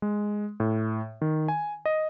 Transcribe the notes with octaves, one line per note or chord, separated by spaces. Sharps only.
G#3
A2
D#3
G#5
D#5